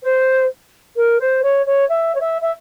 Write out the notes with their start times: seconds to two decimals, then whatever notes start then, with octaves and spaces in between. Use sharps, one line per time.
0.03 C5
0.96 A#4
1.19 C5
1.43 C#5
1.66 C#5
1.89 E5
2.14 C#5
2.20 E5
2.42 E5